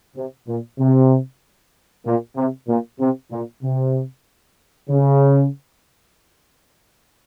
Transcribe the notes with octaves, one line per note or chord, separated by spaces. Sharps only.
C3
A#2
C3
A#2
C3
A#2
C3
A#2
C3
C#3